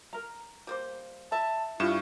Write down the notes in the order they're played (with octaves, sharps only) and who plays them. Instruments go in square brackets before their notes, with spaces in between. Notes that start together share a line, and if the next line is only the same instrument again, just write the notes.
[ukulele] A#4 A#5
[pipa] G3 A#3 C5
[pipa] E5 [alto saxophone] A5 [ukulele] B5
[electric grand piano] G2 C#6 E7 [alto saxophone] E4 [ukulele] F4